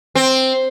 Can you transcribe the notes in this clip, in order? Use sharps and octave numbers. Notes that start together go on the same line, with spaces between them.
C4